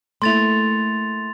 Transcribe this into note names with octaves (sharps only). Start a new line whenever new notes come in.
A3 A#3 E4 C6 A6 F7